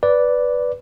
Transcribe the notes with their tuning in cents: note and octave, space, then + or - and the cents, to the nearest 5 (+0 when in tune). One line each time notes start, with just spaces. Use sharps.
B4 +0 D5 -5